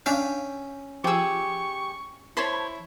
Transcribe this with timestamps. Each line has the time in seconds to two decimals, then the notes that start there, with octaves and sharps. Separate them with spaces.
0.06 C#4 D4 E5 F5 G5
1.04 F3 G4 G#4 C#6 E6
2.37 E4 C5 C#5 A5 B5 C6